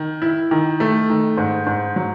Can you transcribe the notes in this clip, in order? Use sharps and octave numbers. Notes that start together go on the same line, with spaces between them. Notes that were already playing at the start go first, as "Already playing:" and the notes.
Already playing: D#3
E4
D#3
A3
D#3
G#2
G#2
F#3